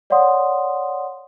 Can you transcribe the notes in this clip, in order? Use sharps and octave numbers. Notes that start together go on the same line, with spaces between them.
C#5 D5 F5 F#5 C6 D#6